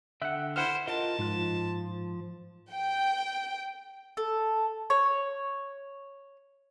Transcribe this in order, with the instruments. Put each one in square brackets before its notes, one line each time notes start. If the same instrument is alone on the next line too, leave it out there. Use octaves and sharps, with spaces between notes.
[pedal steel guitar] D3 G5 F#6 [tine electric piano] E5 F#5
[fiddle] E4 C5 [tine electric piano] F#5 F6
[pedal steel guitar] F4 A#4 D#5 [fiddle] A5
[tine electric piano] G#2 [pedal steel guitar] F3 F4 F#6
[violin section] G5
[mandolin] A4
C#5